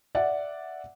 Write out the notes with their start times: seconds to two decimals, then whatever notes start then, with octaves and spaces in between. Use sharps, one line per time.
0.15 D5 E5 F#5